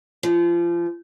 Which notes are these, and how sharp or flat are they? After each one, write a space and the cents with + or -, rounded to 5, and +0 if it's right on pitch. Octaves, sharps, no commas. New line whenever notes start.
F3 -30